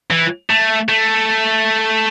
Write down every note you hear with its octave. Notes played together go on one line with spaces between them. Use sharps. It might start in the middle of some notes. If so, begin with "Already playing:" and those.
E3
A3
A3